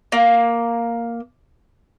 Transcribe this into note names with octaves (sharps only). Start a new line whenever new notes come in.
A#3